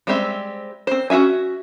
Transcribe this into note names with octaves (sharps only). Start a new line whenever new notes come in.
G3 G#3 C4 G4 E5
C4 C5
C#4 F#4 G#4 E5 G#5